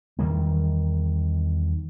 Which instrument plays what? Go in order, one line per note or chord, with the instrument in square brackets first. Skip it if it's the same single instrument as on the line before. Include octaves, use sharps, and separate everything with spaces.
[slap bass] E2 D#3 G3 A#3